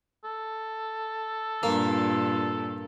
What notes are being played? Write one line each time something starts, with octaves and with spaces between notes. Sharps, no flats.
A4
G2 A#2 A#3